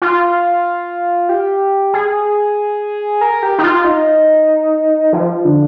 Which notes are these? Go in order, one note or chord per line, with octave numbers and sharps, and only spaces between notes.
F4
G4
G#4
A#4
G4
D#4
F4
D#4
F3
D3